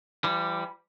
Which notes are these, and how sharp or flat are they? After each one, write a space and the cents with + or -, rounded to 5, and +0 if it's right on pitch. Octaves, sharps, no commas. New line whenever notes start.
E3 +45 G3 +0